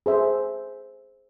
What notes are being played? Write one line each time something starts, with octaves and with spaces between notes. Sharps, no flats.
G#4 C5 E5